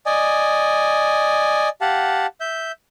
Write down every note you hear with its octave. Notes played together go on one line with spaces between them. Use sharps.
D5 D#5 G#5
G4 F5 F#5 A5
E5 G6